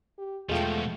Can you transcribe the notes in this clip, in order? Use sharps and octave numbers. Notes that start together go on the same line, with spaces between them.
G4
E2 B2 F3 G#3 A3 F4 G5